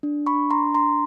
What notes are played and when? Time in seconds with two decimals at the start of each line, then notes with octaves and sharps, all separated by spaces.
0.03 D4
0.26 B5 C#6
0.35 D4
0.50 A#5 C6
0.66 D4
0.74 A#5 C6